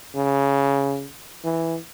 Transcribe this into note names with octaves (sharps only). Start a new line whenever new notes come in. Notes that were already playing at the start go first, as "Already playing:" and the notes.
C#3
E3